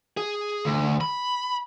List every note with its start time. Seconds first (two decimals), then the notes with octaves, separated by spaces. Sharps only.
0.17 G#4
0.65 D2
1.01 B5